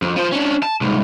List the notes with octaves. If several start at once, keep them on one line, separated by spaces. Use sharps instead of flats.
F2
F3 C5
C#4 D4
A5
C2 G#2